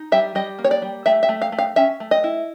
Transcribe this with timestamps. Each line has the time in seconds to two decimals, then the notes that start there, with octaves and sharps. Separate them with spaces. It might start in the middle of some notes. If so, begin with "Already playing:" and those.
Already playing: D#4
0.12 G3 E5
0.35 G3 D#5
0.59 A#3
0.64 C#5
0.71 D5
0.82 G3
1.06 A3 E5
1.23 E5
1.29 A3
1.42 F5
1.52 A3
1.59 F5
1.76 C#4 E5
2.00 A3
2.11 D#5
2.24 E4